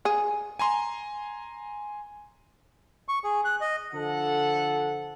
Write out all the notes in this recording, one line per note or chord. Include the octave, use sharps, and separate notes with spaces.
G#4
G#5 A#5 C6
C#6
G#4
F#6
D#5
D3 F3 A4 F#5